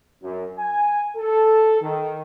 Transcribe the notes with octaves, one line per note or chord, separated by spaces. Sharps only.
F#2
G#5
A4
D#3